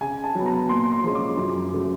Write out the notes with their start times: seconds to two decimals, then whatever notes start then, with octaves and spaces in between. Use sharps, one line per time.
0.01 C#3 G#5
0.24 A5
0.35 F#3 B3
0.46 A#5
0.69 A#2 C6
0.92 C6
1.04 F3 G#3 C#4
1.15 D6
1.37 F#2
1.72 C#3 F#3 A3